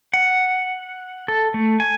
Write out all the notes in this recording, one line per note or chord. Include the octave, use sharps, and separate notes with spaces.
F#5
A4
A3
G#5